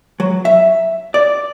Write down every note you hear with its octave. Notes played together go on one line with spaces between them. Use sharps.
F#3
E5
D5